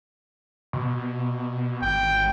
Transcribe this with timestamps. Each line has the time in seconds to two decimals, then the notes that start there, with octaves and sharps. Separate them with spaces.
0.73 B2
1.82 G#1 G5